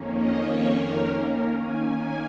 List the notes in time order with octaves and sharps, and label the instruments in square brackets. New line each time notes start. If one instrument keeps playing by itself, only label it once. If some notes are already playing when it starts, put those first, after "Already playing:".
Already playing: [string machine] F2 D#3 A#3 C#4
D#5
C#5
A#4
D#3 A#3 C#4
A#4
G#5